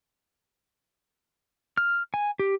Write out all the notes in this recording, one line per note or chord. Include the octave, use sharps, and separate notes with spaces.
F6
G#5
G4